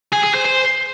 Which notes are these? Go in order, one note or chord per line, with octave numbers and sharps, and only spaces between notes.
G#4
G#4
C5
C5